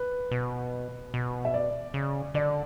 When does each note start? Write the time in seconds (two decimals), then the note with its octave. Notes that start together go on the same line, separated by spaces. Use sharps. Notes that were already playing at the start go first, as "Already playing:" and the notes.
Already playing: B4
0.31 B2
1.14 B2
1.45 E5
1.54 D5
1.94 C#3
2.34 D3 D5